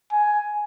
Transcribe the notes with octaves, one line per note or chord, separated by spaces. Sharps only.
G#5